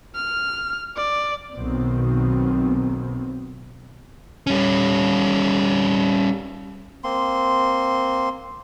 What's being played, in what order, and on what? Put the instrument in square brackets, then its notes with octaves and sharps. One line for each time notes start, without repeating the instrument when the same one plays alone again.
[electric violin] F6
D5
[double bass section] B1 B2 D#3 C4
[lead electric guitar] G3 C#4
[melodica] A#3 C4 C6